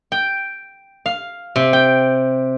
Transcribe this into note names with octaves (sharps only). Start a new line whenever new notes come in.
G5
F5
C3
G5